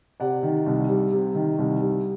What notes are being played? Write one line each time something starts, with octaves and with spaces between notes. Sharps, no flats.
C3 D5 F#5
D#3
C2
G3
C3
D#3
C2
G3